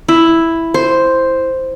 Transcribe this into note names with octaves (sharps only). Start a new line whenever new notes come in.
E4
C5